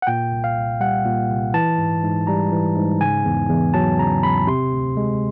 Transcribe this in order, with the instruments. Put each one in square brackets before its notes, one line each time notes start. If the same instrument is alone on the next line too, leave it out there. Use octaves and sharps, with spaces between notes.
[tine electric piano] F#5
A#2 G5
C2
F5
C2
G3 F#5
A#2
C2
E3 A5
G#2
G#2
G3 A#5
E3
G#2
C#3 G#5
E2
E2
F#3 A5
C#3 A#5
E2 B5
C3 C6
D2
G#3